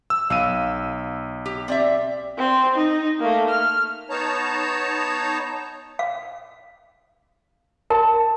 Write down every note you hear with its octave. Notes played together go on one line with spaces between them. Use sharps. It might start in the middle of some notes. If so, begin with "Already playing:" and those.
E6
B1 F5 E6 D#7
G4
C4 D5 E5
C4
D#4
A3 A#3
F6
B3 D#4 C#5 A5 A#5
F5
A#4 A5